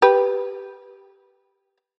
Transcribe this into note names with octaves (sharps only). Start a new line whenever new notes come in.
G4 B4